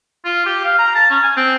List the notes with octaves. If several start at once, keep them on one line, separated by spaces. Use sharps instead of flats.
F4
G4
F5
A#5
A5
C#4
G#5
C4